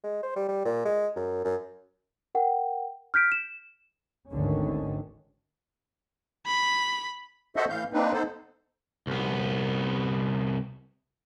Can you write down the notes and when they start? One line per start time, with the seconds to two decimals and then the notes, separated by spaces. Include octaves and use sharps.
0.04 G#3
0.23 C5
0.36 G3
0.49 G3
0.65 A#2
0.85 G#3
1.16 F#2
1.45 F#2
2.35 A#4 F#5 G5
3.14 F6 G6 B6 D7
3.32 E7
4.32 G#1 D2 D3 D#3 C#4
6.47 B5
7.56 F#4 A4 C5 D#5 E5 F#5
7.69 A2 E3 F5 G6
7.93 A#3 C4 D4 D#4 B4
8.13 B3 D#4 A4 C5
9.07 C2 B3